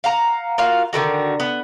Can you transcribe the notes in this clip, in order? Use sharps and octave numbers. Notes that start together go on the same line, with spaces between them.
F5 F#5 A#5
A#3 F4 F#4 F5
D3 D#3 G#3 F#4
B3